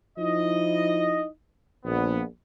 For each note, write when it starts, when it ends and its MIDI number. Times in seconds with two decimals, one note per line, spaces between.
0.18 1.27 53
0.18 1.27 63
0.18 1.27 64
0.18 1.27 75
1.85 2.22 34
1.85 2.22 59